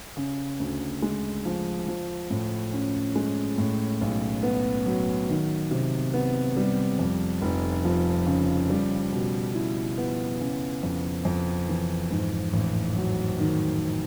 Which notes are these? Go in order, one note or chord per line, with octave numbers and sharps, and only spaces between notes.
C#3
D2
G#3
F3
F3
A2
C#4
G#3
A2
B1
B3
F#3
D#3
C3
B3
G3
F2
F1
F3
C#3
G3
B2
E4
B3
C#3
F2
F2
E3
G#2
A1
F#3
D#3